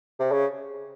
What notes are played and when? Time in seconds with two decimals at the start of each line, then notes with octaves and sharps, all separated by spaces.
0.20 C3
0.32 C#3